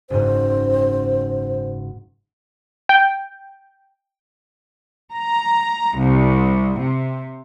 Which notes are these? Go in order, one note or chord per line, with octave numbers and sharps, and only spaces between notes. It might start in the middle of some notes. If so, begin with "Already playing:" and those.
F#1 G#2 C5
G5
A#5
C2
C3